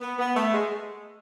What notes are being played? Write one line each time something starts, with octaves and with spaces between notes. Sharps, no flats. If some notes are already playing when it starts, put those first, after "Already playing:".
B3
B3
A3
G#3